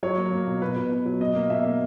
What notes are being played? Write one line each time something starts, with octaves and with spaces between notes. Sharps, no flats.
F#3 C#5
A#3
A#3
B2
B2 B4
B2 B4
B2
F#3
B2 D#5
A#3
B2 E5
A#3